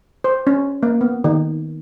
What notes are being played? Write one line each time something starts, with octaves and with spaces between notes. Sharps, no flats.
C5
C#4
A#3
B3
D#3